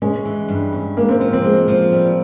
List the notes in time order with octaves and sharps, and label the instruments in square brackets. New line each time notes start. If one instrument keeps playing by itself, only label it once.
[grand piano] G#3 [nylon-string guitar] C#4
[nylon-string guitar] E3
G2
C#4
[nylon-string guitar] G#3 [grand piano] A#3
[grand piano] C4
[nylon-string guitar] F3 [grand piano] C4
[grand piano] C4
[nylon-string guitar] G#3
F3
G3